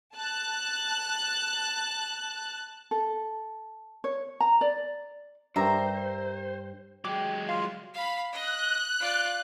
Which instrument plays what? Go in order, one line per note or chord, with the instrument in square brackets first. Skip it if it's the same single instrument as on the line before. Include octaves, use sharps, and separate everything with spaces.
[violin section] A5 F#6
[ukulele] A4
C#5
A#5
D5
[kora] G2 [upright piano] G4 A#4 G5 [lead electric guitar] C5 [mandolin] E5 A#5
[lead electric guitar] F#3 G#3 [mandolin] G4 [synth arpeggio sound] D6
[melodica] F4 [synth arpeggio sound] F5
[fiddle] F5 B5
[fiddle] D#5 [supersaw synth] F#6
[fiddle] F4 D5